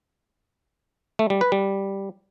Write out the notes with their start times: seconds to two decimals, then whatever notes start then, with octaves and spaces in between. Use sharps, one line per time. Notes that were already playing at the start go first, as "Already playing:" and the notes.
1.19 A3
1.30 G3
1.41 B4
1.52 G3